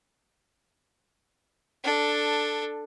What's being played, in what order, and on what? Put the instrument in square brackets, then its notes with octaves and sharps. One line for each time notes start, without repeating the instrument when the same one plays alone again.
[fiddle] D4 A4